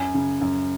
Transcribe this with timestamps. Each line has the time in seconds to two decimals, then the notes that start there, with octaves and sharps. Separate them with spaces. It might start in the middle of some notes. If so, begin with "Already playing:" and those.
Already playing: F#2 G#5
0.14 C#3
0.41 F#2